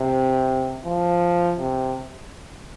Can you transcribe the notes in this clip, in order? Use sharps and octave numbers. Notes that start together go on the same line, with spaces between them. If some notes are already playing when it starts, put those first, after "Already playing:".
Already playing: C3
F3
C3